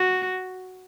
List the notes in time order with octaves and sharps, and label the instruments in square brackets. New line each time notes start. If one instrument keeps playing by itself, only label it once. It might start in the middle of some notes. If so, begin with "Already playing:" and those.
Already playing: [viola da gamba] F#4